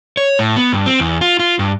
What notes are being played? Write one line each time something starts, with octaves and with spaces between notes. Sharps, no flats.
C#5
A2
B3
G2
C4
E2
F4
F4
G2